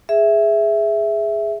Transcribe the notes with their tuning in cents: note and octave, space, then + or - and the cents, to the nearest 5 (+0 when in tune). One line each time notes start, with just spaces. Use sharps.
G#4 +0 E5 +0